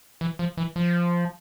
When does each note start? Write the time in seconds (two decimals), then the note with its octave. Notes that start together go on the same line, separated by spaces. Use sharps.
0.21 E3
0.39 F3
0.57 E3
0.76 F3